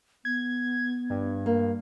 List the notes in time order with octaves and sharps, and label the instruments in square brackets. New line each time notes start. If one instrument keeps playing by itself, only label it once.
[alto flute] B3 [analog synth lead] G#6
[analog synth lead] G2
[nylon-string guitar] A#3